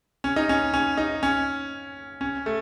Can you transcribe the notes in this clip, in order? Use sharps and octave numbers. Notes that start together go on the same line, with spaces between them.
C#4
D#4
C#4
C#4
D#4
C#4
C#4
A3